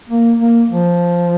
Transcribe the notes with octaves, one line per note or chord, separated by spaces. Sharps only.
A#3
A#3
F3